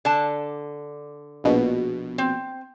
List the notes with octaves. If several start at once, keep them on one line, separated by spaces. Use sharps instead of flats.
D3 A5
A#1 B2
C4